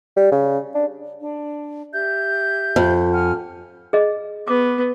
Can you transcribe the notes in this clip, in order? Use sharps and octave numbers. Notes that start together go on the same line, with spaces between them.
G3
C#3
D4
D4
G4 E5 G6
F2
F#5 G#5 F6
G#4 D#5
B3 D6